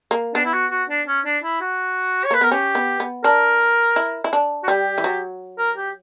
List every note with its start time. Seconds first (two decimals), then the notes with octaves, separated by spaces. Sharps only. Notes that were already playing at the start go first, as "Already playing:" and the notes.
0.11 A#3
0.35 B3 D4
0.45 E4
0.53 F#4
0.71 F#4
0.89 D4
1.07 C#4
1.25 D4
1.43 E4
1.61 F#4
2.25 C#5
2.31 A#3 B4
2.41 B3 A#4
2.51 C#4 G4
2.75 B3
3.00 B3
3.24 D4 A#4
3.96 E4
4.24 E4
4.33 D4
4.63 F#4
4.68 G3 G4
4.98 E3
5.04 F#3
5.58 A#4
5.77 G4